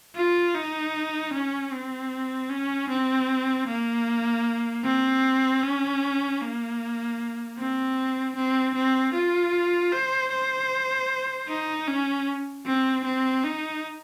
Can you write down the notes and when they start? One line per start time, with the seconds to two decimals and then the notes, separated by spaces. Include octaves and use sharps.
0.16 F4
0.54 D#4
1.33 C#4
1.72 C4
2.50 C#4
2.89 C4
3.67 A#3
4.84 C4
5.62 C#4
6.41 A#3
7.58 C4
8.36 C4
8.75 C4
9.14 F4
9.92 C5
10.31 C5
11.48 D#4
11.88 C#4
12.66 C4
13.05 C4
13.44 D#4